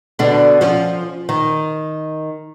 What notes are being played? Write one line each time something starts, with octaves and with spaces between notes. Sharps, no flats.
B2 D3 D4
F3 C#4
D#3